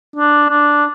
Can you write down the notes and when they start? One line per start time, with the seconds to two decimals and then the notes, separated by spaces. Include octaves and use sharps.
0.16 D4
0.49 D4